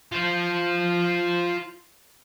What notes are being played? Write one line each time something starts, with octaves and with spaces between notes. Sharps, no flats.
F4 C5